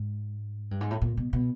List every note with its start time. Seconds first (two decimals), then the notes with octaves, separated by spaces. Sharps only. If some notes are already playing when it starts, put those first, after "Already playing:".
Already playing: G#2
0.71 G2
0.81 G#2
0.91 A2
1.01 A#2
1.17 B2
1.33 B2